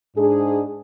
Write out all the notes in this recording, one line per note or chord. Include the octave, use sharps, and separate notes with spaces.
G#2 D4 G#4